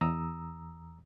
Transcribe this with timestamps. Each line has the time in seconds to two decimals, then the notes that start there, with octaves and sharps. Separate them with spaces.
0.01 E2 A#5 D#6 E6